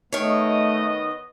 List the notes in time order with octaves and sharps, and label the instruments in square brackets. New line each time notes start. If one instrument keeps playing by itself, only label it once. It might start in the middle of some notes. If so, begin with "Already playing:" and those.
[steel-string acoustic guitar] D#3 C#5 [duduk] A3 [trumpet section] B3 D#5